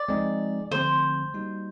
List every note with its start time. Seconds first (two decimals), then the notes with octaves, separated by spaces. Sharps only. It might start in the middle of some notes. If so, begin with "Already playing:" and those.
Already playing: D5
0.08 F3 G#3 C4 D#4 G#4
0.71 D3 F3 A3 C4 C5
1.34 G3 A#3 D#4 F#4